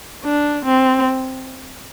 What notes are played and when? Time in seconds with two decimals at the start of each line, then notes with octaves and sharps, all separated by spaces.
0.24 D4
0.65 C4